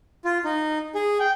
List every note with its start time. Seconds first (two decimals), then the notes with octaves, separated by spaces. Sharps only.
0.25 F4
0.45 D#4
0.95 G#4
1.20 G5